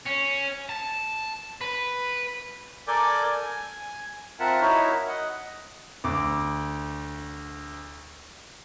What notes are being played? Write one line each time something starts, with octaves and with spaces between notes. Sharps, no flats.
C#4
A5
B4
A4 A#4 D5 G#5 D6 G6
G#5
C4 F4 A#4 E5 F#5 A5
D#4 E4 F#4 A#4 C#5 E5
D#5 F#5
D2 D6